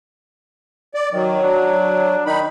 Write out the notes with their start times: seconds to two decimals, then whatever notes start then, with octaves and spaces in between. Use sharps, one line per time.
0.94 D5
1.13 D#3 F#3
1.43 D4
2.26 D#3 D#4 B5